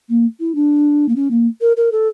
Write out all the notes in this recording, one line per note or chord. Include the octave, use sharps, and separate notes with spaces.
A#3
E4
D4
A#3
C#4
A#3
A#4
A#4
A4